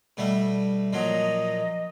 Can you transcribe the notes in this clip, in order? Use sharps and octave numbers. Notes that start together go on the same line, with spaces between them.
B2 G3 A3
A#2 F3 F#3 D#5